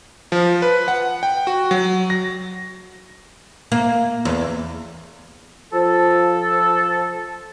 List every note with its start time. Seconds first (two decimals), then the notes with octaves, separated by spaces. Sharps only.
0.32 F3
0.62 B4
0.88 F#5
1.23 G5
1.47 F#4
1.71 F#3
2.10 A#6
3.72 A#3
4.25 E2
5.73 F3 A4